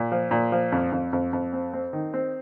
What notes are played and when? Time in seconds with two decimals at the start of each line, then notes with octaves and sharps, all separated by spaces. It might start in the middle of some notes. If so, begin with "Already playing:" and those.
Already playing: A#2
0.12 F3
0.31 A#2
0.52 F3
0.72 F2
0.92 F2
1.13 F2
1.33 F2
1.53 C4
1.73 C4
1.93 D#3
2.14 C4